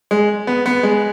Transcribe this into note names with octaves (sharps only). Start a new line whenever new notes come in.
G#3
B3
B3
G#3